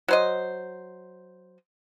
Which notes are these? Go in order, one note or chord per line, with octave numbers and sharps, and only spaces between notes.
F#3 C5 D#5